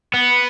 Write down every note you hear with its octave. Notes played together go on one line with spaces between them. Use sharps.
B3